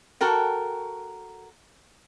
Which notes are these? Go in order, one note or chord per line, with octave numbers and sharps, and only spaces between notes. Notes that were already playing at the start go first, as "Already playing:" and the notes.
F#4 A4 A#4 G5